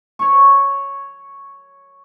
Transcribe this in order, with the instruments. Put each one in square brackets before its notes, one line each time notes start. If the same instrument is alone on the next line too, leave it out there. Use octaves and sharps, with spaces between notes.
[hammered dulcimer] C#5 C#6